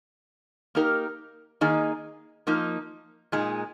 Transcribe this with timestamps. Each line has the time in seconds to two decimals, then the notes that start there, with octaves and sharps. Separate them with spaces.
0.75 A#3 D#4 G4 A#4
1.61 D#3 A#3 D#4 G#4 D#5
2.47 F3 A#3 D#4
3.32 A#2 G#3 D#4